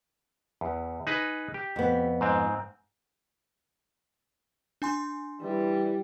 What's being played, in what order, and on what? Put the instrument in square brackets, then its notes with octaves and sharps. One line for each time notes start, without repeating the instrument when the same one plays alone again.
[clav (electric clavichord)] E2
D#4 G#4 B4
G4
[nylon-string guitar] F2 B3
[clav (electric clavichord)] G#2 C4
[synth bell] D4 G#5 C6
[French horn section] E3 [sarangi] G3